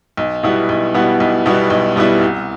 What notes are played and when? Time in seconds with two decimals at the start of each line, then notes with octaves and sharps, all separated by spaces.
0.17 B1
0.43 B2 G3 B3 E4
0.69 B1
0.94 B2 G3 B3 E4
1.20 B1
1.46 B2 G3 B3 E4
1.70 B1
1.96 B2 G3 B3 E4
2.21 C2